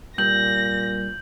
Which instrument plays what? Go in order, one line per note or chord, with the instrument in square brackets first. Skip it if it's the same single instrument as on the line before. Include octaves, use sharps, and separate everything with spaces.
[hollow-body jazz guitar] G2 [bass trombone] A#2 [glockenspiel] G6 F#7 [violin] A#6